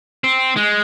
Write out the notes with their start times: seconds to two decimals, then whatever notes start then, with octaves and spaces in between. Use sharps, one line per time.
0.24 C4
0.56 G#3